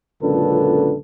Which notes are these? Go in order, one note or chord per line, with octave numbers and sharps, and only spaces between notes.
C#2 F#2 A#2 D3 A4 B4